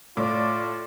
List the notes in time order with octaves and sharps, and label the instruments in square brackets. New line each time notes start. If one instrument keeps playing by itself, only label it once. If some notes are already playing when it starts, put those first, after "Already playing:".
[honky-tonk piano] A2 D6 [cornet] F4 [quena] D5